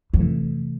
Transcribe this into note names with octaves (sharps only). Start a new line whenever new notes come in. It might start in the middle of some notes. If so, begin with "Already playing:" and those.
F2
C3 E3 A3